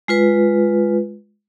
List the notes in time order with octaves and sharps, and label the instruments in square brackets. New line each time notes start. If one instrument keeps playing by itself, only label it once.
[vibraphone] G#3 F4 B4